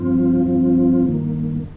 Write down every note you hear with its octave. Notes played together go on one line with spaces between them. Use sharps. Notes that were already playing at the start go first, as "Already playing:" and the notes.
Already playing: G2 F3 C4 F4
G2 F3 C4 F4
G2 D#3 A#3